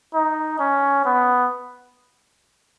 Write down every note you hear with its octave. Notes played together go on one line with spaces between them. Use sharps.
D#4
C#4
B3